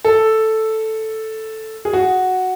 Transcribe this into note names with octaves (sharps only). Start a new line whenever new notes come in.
A4
G#4
F#4